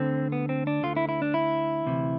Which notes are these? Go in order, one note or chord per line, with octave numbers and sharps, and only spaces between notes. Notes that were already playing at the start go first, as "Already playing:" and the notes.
Already playing: D2 D3 C4
B3
C4
D4
D2 D3 F4
E4
E4
D4
E4
D2 C3 E3